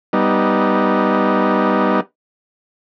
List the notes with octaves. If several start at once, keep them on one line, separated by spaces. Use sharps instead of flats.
G3 B3 D#4